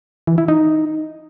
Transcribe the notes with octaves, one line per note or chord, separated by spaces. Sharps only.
E3
E4
D#4